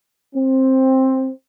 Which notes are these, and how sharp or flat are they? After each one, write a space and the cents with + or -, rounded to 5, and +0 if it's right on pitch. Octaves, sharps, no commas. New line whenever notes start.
C4 +10